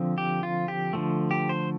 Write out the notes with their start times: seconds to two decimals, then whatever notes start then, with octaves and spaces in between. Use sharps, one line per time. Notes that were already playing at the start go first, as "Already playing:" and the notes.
Already playing: D3 F3 C4
0.18 G4
0.43 F4
0.68 G4
0.93 D3 F3 A3
1.31 G4
1.49 C5